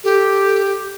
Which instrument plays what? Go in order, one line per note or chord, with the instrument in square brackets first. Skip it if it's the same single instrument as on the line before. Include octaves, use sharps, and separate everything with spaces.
[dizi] G4 [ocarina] A4